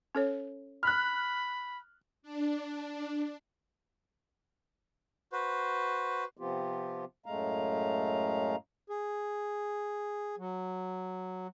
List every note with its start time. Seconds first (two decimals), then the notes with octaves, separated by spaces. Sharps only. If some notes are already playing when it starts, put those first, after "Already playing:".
0.15 C#4 A4 C#5
0.83 B5 F6 F#6
2.22 D4
5.32 F#4 B4 C5
6.37 C3 F3 B3 C4 F4 G4
7.26 F#2 A2 G#3 A3 F5 A#5
8.90 G#4
10.38 F#3